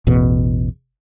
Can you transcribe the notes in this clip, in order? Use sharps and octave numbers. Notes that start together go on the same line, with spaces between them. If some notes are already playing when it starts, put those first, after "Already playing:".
A1 E2 B2